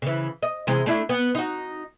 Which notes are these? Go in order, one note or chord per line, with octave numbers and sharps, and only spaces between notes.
C#3 E3
D#5
C3 E3 G#3
A3 D4 E4
B3
D#4 F#4